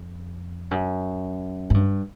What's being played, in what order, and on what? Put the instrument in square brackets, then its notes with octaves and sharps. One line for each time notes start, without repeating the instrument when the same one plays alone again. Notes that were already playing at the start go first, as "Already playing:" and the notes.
Already playing: [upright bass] F2
F#2
G#2
G2